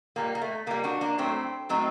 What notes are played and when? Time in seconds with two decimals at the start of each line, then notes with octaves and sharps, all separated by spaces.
0.16 A#2 G3 A#3
0.35 A#3
0.42 A3
0.67 A#2 G3 A#3
0.84 D4 F#4
1.01 A#3 D4
1.18 A2 F#3 A3 C4
1.69 A2 F#3 A3 C4 D#4